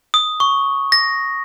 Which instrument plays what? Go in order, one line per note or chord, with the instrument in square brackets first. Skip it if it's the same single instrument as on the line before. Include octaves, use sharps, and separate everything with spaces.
[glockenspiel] D#6
C#6
A#6